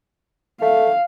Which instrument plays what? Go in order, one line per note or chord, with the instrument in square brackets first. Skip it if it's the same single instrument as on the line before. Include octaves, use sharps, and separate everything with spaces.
[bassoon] A3 [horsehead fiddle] F5